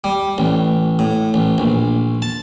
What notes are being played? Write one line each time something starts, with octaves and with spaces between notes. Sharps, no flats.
G3
A1
A2
A1
A#1
A5